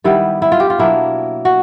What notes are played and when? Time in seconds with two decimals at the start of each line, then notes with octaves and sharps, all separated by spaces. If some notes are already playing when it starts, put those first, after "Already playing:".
0.04 D#3 G3 B3 E4
0.42 E4
0.52 F4
0.60 G4
0.70 F4
0.78 B2 F#3 A#3 D4 E4
1.45 F#4